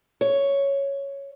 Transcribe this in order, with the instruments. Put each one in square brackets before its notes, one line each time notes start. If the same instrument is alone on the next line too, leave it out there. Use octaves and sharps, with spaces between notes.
[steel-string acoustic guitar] C#5